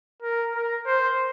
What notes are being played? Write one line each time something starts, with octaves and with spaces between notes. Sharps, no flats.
A#4
A#4
C5